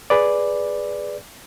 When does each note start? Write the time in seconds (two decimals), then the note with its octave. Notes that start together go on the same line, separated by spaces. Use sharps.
0.10 G#4 B4 D5